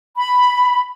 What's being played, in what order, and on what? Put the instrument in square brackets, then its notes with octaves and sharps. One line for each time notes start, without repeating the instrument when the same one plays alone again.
[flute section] B5